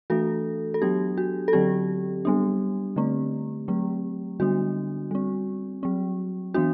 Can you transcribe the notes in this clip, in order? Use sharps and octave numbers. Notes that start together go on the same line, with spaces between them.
E3 A3 D4 F#4 A4
A4
F#3 B3 D4 G4
F#4
A4
D3 F#3 C4 G4
G3 B3 D4
D3 A3 C4
F#3 A3 C4
D3 G3 B3 D4 F#4
G3 C4
F#3 C4
E3 B3 D4 F#4